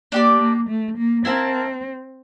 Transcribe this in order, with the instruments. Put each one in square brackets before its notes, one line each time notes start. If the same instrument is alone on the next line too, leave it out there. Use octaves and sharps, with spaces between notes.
[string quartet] A#3 [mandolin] D4 G4 D5
[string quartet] A#3
A3
A#3
[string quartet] C4 [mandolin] E4 A#4 F5 A5